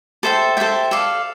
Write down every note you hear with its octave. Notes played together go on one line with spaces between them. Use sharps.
A4 C5 E5 G5
A4 C5 E5 G5
A4 D5 F5